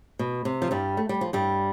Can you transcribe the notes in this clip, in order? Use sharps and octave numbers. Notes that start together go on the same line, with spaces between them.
B2
C3
F3
G2 G3
A3
G3
F3
G2 G3